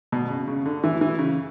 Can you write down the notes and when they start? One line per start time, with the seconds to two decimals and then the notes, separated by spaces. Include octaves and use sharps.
0.12 B2
0.30 C#3
0.48 C#3
0.65 D3
0.84 E3
1.01 E3
1.19 C#3